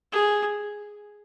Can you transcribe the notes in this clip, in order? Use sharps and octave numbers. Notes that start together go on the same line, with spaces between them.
G#4